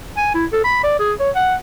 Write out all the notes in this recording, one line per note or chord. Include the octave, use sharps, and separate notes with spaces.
G#5
E4
A4
B5
D5
G#4
C#5
F#5